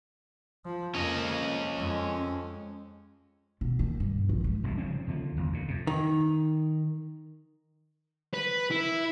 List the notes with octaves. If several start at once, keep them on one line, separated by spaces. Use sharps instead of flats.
F3
F2 A#3 C#4 D#5
F2 G#3
B2
D#2
G2
A#1
G#2
E1 C2 F2 G#2
C#3 F3 C4 C#4
D#2 D3 E3 F3
G1 E2
D2 A#2
F2 C3
D#3
B4
E4